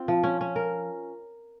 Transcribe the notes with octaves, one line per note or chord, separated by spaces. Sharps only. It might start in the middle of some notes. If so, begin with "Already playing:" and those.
Already playing: C4 F4
F3
C#4
C#4
A#4